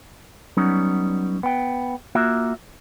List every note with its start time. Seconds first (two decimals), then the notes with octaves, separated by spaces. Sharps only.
0.57 F#3 G3 B3 C#4 D#4
1.43 B3 G5
2.15 A#3 F4 F#4 E5